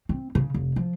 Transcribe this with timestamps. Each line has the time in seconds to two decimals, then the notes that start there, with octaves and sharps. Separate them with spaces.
0.09 C4
0.35 C#3
0.54 F1
0.76 F3